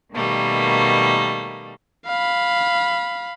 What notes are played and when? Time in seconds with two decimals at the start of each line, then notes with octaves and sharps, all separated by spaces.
0.12 B2 D#3 G3 A3 A#3
2.06 F5 B5